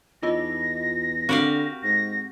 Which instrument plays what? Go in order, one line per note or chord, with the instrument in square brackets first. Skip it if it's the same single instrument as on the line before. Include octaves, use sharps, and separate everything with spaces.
[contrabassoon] E2 [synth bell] D#4 F4 D#5 [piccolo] A#6
[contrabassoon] D3 [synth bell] C4 [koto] F#4 G4 F5
[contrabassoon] G#2 [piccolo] A#6